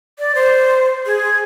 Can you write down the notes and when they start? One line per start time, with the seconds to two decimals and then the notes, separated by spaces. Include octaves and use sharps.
0.19 D5
0.35 C5
1.06 G#4